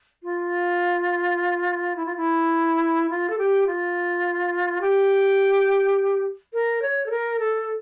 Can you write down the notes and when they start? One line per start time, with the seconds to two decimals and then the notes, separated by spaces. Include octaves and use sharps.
0.23 F4
1.96 E4
2.05 F4
2.16 E4
3.10 F4
3.30 A4
3.38 G4
3.67 F4
4.81 G4
6.53 A#4
6.82 C#5
7.06 A4
7.10 A#4
7.39 A4